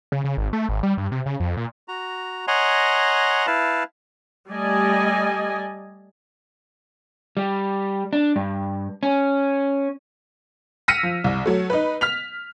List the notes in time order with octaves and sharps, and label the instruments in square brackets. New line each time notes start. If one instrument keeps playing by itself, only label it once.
[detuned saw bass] C#3
C#3
G#1
A3
G#1
G3
G2
C3
C#3
F2
A#2
[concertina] F#4 A#5
C#5 D#5 F#5 G#5 A#5 C6
E4 B4 F5 A5
[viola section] G3 A3 D5 D#5 G#5
[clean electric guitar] G3
D4
G2
C#4
[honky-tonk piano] E6 F6 A#6 B6 C#7 D#7
F3
C2
F#3 A3
D#4 B4
F6 B6 F7